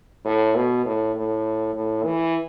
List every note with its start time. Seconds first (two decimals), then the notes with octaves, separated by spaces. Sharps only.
0.25 A2
0.55 B2
0.85 A2
1.15 A2
1.75 A2
2.04 E3